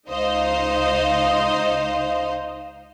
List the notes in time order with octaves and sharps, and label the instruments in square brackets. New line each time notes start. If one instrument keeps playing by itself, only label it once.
[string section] C#2 D#4 C5 D#5 F5